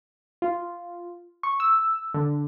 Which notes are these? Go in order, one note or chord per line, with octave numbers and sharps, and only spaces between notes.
F4
C#6
E6
D3